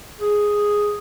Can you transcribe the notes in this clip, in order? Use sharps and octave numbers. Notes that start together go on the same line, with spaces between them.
G#4